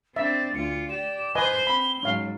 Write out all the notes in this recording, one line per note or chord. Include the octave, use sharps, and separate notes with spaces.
C4 D4 E5 A6
D2 F4 C#7
G4 D5 E7
B4 C5 D#5 G#5 G7
C4 B5
G#2 F#3 C#4 F5